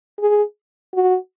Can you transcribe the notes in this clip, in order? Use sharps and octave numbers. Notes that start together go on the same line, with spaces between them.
G#4
F#4